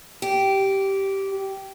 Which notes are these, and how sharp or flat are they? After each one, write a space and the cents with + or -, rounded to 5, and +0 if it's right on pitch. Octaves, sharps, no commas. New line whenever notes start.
G4 -10